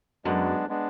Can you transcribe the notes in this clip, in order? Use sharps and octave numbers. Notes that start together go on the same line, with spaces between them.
F#2 G#3 B3 D4
G#3 B3 D4